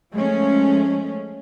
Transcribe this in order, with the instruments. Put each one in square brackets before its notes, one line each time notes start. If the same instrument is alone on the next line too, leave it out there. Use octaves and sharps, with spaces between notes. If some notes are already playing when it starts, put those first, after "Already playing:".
[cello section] F3 G#3 A3 C#4